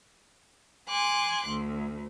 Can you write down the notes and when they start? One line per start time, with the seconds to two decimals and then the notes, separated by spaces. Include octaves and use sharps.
0.88 G#5 C6 D6 F#6
1.47 D2